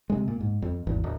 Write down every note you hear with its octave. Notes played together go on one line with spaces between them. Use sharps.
C3 G#3
A#2
G#2
F2
G#1 E2
D1